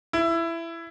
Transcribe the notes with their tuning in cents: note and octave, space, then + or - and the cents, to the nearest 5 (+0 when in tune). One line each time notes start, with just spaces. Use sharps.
E4 +15